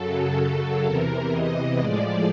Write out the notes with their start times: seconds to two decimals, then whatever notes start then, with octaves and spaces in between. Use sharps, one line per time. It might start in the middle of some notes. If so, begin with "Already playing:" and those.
Already playing: F#2 C#3 F#3 A4
0.85 E2 C3 E3 A#4
1.32 D#5
1.78 A2 F3 G#3 D5